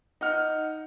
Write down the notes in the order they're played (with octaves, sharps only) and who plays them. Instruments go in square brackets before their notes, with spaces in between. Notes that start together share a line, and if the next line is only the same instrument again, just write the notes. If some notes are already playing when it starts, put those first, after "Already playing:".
[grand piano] D#4 F#5 F6